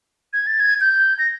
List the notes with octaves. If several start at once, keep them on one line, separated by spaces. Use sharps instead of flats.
G#6
A6
G#6
G6
A#6